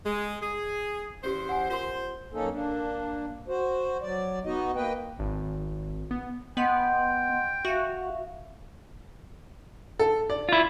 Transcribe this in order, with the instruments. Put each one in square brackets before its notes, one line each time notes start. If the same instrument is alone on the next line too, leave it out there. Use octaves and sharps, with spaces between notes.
[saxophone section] G#3
G#4
[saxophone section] E2 C5 [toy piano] C#4 G4
[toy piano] F#5 G#5
[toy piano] F4 A#4 C6 [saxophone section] C5
[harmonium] F#2 A#3 C#4 D#4 A4
A#3 D4
F#4 C5
F#3 D5
B3 D#4 F#4 D#5
A#3 B4 D#5 G5
[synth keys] G#1
B3
[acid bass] B3 [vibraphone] D#5 F#5 C6 [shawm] G5
[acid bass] F#4 [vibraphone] E5 F5
[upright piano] A4
D5
[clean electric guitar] E4 F4